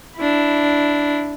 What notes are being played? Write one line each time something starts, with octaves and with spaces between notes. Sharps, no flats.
D4 E4